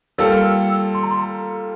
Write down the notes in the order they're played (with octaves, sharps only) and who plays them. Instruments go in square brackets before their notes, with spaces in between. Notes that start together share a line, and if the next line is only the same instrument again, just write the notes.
[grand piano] G3 A#3 F4 A4 [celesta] E6
[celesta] F6
E6
E6
C6
A#5
C6
A#5